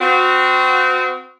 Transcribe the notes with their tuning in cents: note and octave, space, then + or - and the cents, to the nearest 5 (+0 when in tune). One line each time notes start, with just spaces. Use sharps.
C4 -30 F#4 -20